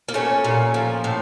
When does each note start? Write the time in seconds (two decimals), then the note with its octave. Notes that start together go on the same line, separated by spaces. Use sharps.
0.09 A#3
0.14 A#2 A3 C#4
0.44 A#2
0.74 F3
1.04 A2